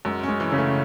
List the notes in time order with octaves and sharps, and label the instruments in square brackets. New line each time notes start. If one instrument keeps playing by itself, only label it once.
[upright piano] F#2 [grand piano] G#3
[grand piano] G#3 [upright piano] C#4
[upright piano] E3
[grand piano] C#3 C#4
[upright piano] A3